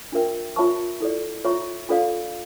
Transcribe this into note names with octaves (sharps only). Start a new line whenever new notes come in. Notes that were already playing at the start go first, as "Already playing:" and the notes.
D4 F4 A#4 E5 G5
F4 C#5 E5 A5 C#6
E4 A4 D5
F4 C#5 E5 A#5 C#6
D4 F4 A4 D5 F5